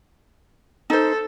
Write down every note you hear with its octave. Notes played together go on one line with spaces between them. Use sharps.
D#4 A4 C5